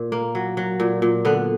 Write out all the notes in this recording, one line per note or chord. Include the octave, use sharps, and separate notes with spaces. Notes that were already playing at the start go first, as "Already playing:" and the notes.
Already playing: A#2
A#3
F#3
F#3
A#2
A#2
D3 B3